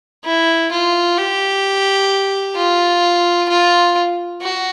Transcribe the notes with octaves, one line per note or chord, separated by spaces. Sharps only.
E4
F4
G4
F4
F4
F#4